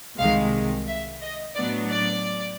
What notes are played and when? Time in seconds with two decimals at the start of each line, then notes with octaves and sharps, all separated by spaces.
0.18 C2 C3 D#3 G#3 F5
0.87 E5
1.21 D#5
1.55 A2 F#3 B3 D4 D5
1.89 D5